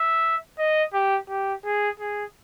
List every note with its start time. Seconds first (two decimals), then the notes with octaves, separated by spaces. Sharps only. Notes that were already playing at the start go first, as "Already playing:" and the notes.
Already playing: E5
0.59 D#5
0.94 G4
1.29 G4
1.65 G#4
2.00 G#4